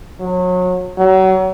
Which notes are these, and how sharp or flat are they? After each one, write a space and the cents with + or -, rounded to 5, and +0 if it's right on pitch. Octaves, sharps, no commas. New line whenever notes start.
F#3 -30
F#3 +30